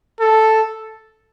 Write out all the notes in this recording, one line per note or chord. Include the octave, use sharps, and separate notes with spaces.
A4